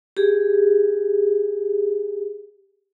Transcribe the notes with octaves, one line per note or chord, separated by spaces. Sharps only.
G4 G#4